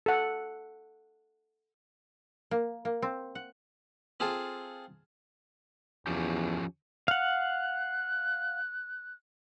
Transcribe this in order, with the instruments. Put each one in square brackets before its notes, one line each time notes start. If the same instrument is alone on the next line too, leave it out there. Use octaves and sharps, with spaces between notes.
[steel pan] A4 F#5
[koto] A#3
A#3
C4
F#5
[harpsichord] C4 F4 G#4 A4
[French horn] E2 [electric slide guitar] F3 C#4 G4
[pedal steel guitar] F5 F#5 [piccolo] F#6